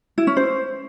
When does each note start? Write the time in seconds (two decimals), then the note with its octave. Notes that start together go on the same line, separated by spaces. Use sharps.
0.18 E4
0.27 C#4
0.37 C5